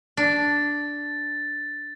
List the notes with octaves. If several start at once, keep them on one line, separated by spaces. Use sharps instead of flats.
D4 A6